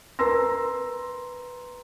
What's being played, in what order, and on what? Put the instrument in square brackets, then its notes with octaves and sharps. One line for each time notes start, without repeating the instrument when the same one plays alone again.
[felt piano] A#4 B4 A#5 C6 E6 A#6